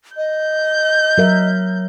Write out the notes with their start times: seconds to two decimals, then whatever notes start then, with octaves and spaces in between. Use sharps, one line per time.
0.17 D#5 G6
1.18 F#3 A#4 E5